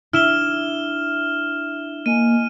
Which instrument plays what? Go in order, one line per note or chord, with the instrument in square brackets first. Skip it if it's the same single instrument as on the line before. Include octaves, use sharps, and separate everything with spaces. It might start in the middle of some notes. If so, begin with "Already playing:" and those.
[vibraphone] D4 E5 [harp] E4 [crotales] F6 E7 G7
[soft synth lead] A#3 [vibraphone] D#5 G#5 [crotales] D#7